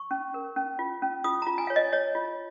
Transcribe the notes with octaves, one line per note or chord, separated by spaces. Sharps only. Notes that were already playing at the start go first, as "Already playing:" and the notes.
Already playing: C#6
C#4
A#4
C#4
F4
C#4
F4 D#6
F4 A#5
G#5
C#5 F5
D#5
C#5 D#5
F4